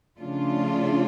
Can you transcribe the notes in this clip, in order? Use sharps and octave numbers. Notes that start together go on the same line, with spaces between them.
C#3 F3 A3 D4 F4